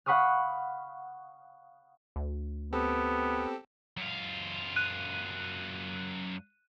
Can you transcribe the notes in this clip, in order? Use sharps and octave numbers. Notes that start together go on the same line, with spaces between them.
F5 F#5 B5 C#6 D#6 F6
D2
B3 C4 G4 A4
F#2 F4
F#6 D#7